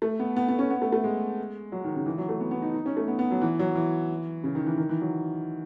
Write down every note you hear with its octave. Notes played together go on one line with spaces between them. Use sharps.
A3
B3
B3
B3
C#4
B3
A3
A3
G#3
F#3
D#3
C#3
E3
F#3
A3
B3
B3
D#4
D#4
C#4
A3
B3
B3
F#3
E3
F#3
E3
C#3
D#3
E3
D#3
E3
F#3